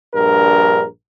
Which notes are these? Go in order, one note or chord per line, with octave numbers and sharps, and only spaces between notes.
A#1 G2 A#4